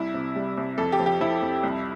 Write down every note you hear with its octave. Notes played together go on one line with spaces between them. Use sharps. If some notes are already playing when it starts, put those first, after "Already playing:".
Already playing: C2 E4
C3
G3
C2
F2 A4
G4
F3
G4
F3 E4
F2
C2